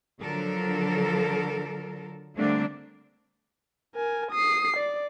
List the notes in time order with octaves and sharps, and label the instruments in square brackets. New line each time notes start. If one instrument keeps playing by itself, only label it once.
[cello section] D3 F3 F#3 A4 A#4
D3 G3 A3 A#3 C4 D4
[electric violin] A#4 G#5
D#6 C7
D5